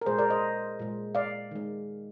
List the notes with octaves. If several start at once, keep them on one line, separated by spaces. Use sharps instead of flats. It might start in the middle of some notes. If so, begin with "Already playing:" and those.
A#4
A#2 G#3 G#4 C5
A#4 D5
C5 D#5
A#2 G#3
D5 F5
D#3 G#3